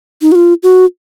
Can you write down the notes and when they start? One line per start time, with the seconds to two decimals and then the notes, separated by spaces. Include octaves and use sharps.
0.22 D#4
0.32 F#4
0.35 F4
0.63 F#4